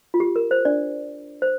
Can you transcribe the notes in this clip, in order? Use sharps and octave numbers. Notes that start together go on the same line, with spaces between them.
F4
G4
A#4
C5
D4 D5
C5